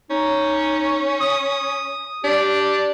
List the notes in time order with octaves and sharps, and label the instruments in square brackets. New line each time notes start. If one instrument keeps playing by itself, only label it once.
[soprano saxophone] C#4 [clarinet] D#4
[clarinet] D#6
[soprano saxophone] D4 [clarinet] G4